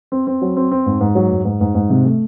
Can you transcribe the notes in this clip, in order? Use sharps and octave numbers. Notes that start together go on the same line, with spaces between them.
C4
C4
F#3
C4
C4
G#2
G#2
F#3
G#2
G#2
G#2
G#2
C3
A3